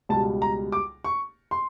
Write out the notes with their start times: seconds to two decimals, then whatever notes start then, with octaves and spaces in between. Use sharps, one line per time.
0.09 C#2 B2 G3 A5
0.42 A#5
0.72 D6
1.04 C#6
1.51 C6